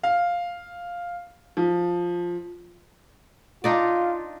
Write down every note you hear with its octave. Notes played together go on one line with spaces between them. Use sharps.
F5
F3
D4 D#4 F4 D5